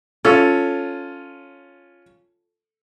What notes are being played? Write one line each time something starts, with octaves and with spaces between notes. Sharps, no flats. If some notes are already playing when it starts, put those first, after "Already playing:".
C#4 F4 A4